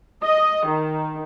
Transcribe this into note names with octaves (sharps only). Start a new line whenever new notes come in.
D#5
D#3